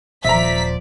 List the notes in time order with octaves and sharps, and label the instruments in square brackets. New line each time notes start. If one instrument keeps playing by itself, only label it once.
[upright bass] D#1 [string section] F3 B6 [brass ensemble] C5 D5 [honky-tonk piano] E5 A#5